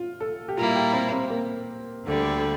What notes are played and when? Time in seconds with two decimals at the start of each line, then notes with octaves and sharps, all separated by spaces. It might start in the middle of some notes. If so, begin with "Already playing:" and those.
Already playing: F4
0.20 A4
0.48 G4
0.57 A#2 G3 A#3 E4 F4
0.75 G4
0.93 C4
1.12 C4
1.30 A#3
2.04 D2 D3 G3